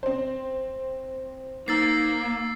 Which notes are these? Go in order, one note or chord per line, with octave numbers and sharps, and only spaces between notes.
C4 C5
A#3 D#4 E6 A6 C7